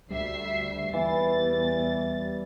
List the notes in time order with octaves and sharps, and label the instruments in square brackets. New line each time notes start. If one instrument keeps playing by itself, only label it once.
[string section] D2 E5 C7 [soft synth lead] G3
[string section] E2 A6 [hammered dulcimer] E3